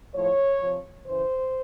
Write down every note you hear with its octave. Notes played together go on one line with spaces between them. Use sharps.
A2 F3 C#5
C3 F3
C#3 E3 C5